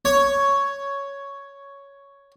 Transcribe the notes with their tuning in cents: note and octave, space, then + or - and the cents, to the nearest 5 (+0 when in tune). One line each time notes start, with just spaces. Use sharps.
C#5 +5